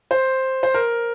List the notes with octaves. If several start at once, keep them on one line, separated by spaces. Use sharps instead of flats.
C5
C5
A#4